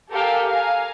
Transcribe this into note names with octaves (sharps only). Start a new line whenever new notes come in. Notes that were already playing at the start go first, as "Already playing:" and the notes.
G4 A4 A#4 F5 G5 G#5
F5 G#5 A#5